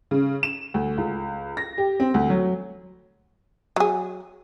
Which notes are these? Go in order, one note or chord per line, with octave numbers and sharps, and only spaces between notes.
C#3
E7
D2
C#2
A#6
G4
C4
D2
F#3
F#3 G#4